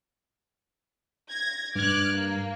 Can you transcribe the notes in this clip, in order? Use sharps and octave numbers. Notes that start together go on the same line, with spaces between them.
G#6 A#6
G2 D6 F6 F#6 G#6
A#3